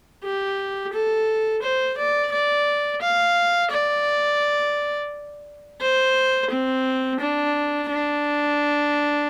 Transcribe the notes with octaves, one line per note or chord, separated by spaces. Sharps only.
G4
A4
C5
D5
D5
F5
D5
C5
C4
D4
D4